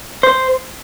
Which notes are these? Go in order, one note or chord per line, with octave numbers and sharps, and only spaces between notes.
C5